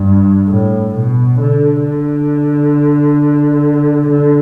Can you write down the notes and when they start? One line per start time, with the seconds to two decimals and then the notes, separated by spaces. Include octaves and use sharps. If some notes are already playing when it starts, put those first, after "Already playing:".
Already playing: G2
0.49 A2
0.95 B2
1.40 D3
1.84 D3
4.10 D3